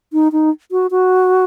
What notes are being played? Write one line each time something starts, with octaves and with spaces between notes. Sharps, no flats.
D#4
D#4
F#4
F#4